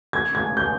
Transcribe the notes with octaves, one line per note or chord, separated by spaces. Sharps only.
G#6
G#6
G6